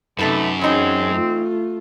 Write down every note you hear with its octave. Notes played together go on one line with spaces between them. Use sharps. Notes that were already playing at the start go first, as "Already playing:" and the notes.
F#2 C3 A3 D#4 A4 B4
E3 C4 C#4 D#4 G#4
A3 F4